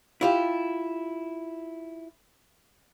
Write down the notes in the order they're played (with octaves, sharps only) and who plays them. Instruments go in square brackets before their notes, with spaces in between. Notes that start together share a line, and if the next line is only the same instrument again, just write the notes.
[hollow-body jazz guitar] E4 F4 G4